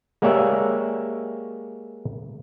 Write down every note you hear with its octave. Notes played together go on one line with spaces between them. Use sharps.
G#3 A#3 G4 C#5 D5 E5